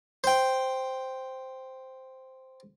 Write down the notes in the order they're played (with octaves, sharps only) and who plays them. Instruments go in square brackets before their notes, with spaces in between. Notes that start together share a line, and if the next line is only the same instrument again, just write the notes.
[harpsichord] C5 G5